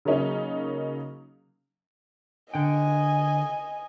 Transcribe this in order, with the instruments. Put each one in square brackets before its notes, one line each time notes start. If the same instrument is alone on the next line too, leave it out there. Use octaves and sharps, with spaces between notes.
[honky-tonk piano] C#3 F#3 A#3 C#4 D#4
[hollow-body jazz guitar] D3 G5 [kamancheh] D#5 G#5